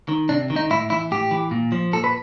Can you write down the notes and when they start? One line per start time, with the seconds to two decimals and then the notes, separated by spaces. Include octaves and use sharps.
0.09 D#3
0.29 C3 D4
0.50 D#3
0.56 D#4
0.70 A2 E4
0.90 E3 E4
1.11 A2 G4
1.31 E3
1.51 A#2
1.72 F3
1.93 A#2 A4
2.04 B4